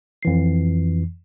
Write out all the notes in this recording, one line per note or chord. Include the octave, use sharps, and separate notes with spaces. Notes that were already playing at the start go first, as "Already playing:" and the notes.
F2 E3 C7